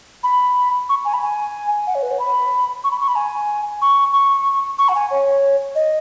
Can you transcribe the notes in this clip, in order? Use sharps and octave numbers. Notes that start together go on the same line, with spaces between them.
B5
C#6
G#5
B5
G#5
F#5
C#5
B4
C#5
B5
C#6
B5
C#6
B5
G#5
C#6
C#6
C#6
F#5
G#5
C#5
D#5